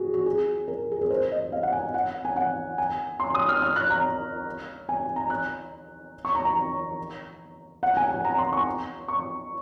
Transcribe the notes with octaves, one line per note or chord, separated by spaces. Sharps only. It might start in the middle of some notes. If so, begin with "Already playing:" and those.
Already playing: F#4 G#4
F#4
G#4
A#4
G#4
A#4
C5
D#5
F5
F#5
G#5
F#5
G#5
F#5
G#5
C6
D#6
F6
F6
F#6
A#5
G#5
A#5
F#6
C#6
A#5
A#5
F#5
G#5
G#5
A#5
C6
C#6
C#6